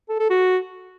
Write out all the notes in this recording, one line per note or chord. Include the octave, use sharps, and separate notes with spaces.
A4
A4
F#4